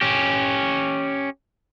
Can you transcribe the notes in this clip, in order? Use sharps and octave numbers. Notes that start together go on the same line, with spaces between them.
C#4 G4